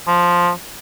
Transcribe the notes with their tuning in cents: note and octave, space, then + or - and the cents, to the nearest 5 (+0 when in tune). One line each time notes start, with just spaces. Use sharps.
F3 +5